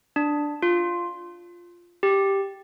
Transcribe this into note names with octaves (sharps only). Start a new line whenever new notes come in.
D4
F4
G4